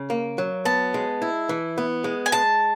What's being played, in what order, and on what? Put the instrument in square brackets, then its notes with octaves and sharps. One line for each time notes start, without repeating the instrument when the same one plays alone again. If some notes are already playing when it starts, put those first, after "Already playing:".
Already playing: [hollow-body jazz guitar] C#3
A#3
F#3
[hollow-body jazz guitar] B3 [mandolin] A5
[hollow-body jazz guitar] G#3
E4
E3
B3
G#3
[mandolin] G#5
[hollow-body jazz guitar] G#3 [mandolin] A5